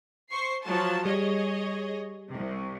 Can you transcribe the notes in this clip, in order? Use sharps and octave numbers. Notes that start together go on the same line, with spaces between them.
C5 C#6 C7
F3 F#3 A5
G3 G#4 C#5 D#5
C2 C3